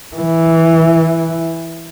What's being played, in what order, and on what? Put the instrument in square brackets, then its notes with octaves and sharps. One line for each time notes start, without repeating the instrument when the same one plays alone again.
[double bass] E3